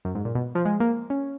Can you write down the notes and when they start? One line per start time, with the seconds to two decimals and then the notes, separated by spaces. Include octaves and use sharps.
0.05 F#2
0.15 G#2
0.25 A#2
0.35 B2
0.55 F3
0.65 G#3
0.80 A#3
1.10 C#4